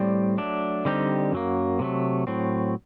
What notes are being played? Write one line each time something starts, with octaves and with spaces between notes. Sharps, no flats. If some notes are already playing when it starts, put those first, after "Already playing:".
Already playing: A2 G3 C4 G4 D5
F#3 A3 D4
D3 G3 C4 D#4 G4
F#2 F#3 A#3
C3 F#3 A3
A2 F#3 C4